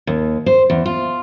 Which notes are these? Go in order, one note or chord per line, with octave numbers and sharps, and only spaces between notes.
D#2
C5
E2
F4